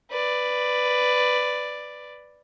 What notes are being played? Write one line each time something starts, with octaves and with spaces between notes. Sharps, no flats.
B4 D5